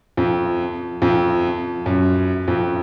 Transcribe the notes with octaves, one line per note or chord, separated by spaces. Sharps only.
F2
F2
F#2
F2